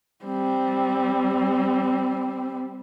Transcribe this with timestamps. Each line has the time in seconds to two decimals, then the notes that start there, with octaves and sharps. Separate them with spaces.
0.25 G3 C4